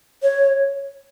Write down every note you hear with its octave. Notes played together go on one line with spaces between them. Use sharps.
C#5